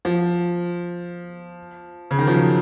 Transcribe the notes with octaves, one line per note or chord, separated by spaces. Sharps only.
F3
C#3
D#3
F3
F#3